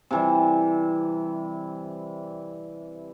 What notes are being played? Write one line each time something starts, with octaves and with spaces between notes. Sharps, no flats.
C3 E3 G3